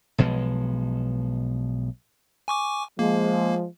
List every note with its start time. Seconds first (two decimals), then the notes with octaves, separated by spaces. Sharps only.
0.18 B1 B2 F3 G#3
2.48 G#5 C#6 D6
2.99 F3 G#3 A#3